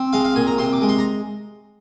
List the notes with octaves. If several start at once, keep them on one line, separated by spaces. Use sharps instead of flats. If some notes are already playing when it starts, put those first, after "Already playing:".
Already playing: C4
G#3 F5
F5
A#2 G#5
A#5
C3 C6
D6
G#3
C6
A#5